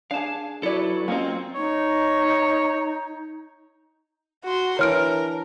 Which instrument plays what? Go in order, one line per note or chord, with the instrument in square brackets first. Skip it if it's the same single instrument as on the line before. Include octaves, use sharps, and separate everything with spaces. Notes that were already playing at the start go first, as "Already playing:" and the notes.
[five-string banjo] D4 G#4 [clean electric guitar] F5 A5
[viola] F#3 [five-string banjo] E4 D5 [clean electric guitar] A4 B4
[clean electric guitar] F#3 C#4 F4 [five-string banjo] A#3 D#5 [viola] C4
[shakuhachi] D#4 [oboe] C#5
[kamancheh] F#4 C6
[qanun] E3 D4 [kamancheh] A#4 [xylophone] C#5 F6 D7